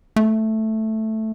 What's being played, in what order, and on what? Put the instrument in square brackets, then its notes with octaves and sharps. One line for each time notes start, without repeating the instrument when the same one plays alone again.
[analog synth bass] A3